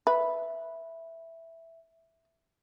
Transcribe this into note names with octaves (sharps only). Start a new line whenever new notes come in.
B4 E5